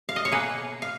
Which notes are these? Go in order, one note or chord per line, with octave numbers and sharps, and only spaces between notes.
F5
D#5
C#5
B2 A#3 G#4 B4
F5